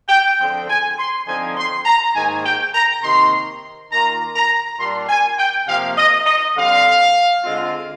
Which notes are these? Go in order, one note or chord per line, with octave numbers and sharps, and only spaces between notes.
G5
D3 F3 C4
G#5
C6
D3 F3 C4 D#4 G#5
C6
A#5
G#2 D#3 A#3 G#5
G5
A#5
C3 D#3 A#3 C6
D#3 A#3 F4 A#5
A#5
A#2 G3 D4 C6
G#5
G5
C3 F3 A#3 F5
D#5
D#5
D3 G3 C4 F5
D3 G#3 C4 F4